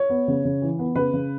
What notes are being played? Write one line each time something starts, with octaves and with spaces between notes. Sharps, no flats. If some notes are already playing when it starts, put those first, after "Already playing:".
Already playing: C#5
B3
C#3
C#3
E3
B3
C#3 B4
C#3